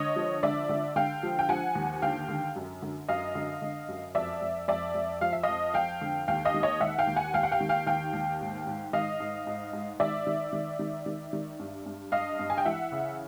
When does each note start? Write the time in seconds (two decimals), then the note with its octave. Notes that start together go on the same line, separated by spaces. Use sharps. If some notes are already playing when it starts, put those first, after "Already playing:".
Already playing: D3 C#5 D#5
0.16 F3
0.43 D3 D5 E5
0.69 D3
0.96 D3 F5 G5
1.23 F3
1.39 G5
1.49 F3 F#5 G#5
1.75 D#2
2.02 D3 F5 G5
2.29 D3
2.56 F#2
2.82 D3
3.09 F#2 D#5 F5
3.35 D3
3.62 D3
3.89 F#2
4.15 F2 D5 E5
4.42 F2
4.68 F2 D5 E5
4.95 F2
5.21 F3 F5
5.33 E5
5.43 F2 D#5 F5
5.74 F2 F5 G5
6.01 D3
6.28 D#2 F5 G5
6.45 D#5 F5
6.54 D#3
6.63 C#5 D#5
6.80 D#2 E5 F#5
6.99 F5 G5
7.07 D#2
7.16 F#5 G#5
7.34 D#2 F5 G5
7.43 F#5
7.51 F5 G5
7.60 D#3
7.69 F5 G5
7.87 D#2 F5 G5
8.13 D#2
8.41 G#2
8.67 G#2
8.93 D#3 D#5 F5
9.20 G#2
9.47 G#2
9.73 G#2
10.00 D#3 D5 E5
10.27 D#3
10.53 D#3
10.79 D#3
11.06 D#3
11.33 D#3
11.59 G2
11.86 G2
12.12 G2 D#5 F5
12.39 G2
12.50 G#5
12.58 G5
12.65 E3 E5 F#5
12.92 C#3